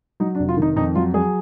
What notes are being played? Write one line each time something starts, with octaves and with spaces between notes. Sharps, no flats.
F#3 D#4
D4
F1
F4
D#3 D#4
F2 D#4
F#3 F4
F#3 G#4